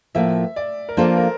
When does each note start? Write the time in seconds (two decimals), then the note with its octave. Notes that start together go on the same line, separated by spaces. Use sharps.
0.15 A2 F3 A#3 E5
0.56 D5
0.89 A#4
0.97 F3 A#3 D4 F4 A4 C5
1.17 A#4